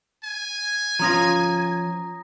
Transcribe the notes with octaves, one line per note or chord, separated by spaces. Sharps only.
G#5
F3 C#4 F4 A#5 D#6 A#6